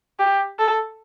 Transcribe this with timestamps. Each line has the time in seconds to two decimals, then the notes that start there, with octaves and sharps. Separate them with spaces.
0.19 G4
0.59 A4